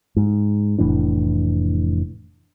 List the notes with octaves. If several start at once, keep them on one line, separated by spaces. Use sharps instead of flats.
G#2
F1 A2 E3 D4